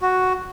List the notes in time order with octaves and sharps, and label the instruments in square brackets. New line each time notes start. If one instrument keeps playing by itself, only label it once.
[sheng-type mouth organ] F#4